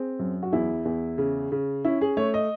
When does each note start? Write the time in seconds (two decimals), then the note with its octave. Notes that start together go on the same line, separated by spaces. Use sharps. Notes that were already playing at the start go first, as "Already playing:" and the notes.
Already playing: C4 G#4
0.19 F#2
0.43 F#4
0.52 E2 E4
0.85 E2
1.18 C#3
1.52 C#3
1.85 C#4 E4
2.01 G#4
2.17 A3 C#5
2.34 D#5